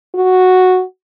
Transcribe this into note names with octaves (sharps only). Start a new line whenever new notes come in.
F#4